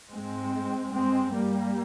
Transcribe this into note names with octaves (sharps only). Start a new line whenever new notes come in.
G#2 G#3 C4
G2 G#3 C4
G3 A#3